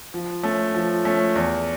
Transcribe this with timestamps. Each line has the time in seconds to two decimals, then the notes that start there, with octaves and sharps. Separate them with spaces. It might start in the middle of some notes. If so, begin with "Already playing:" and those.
0.14 F3
0.43 A3 C#4
0.75 F3
1.05 A3 C#4
1.36 E2